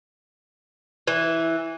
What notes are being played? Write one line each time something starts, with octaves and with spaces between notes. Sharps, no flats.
E3